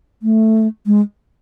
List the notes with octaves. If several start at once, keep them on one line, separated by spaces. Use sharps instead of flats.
A3
G#3